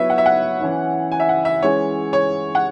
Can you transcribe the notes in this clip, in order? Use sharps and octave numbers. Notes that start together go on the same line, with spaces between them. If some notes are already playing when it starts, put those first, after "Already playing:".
Already playing: F#3 B3 E4 B4 C#5 E5
F#5
E5
F#5
E3 C#4 E4
G#5
E5
F#5
E5
E3 G#3 C#4 C#5
C#5
F#5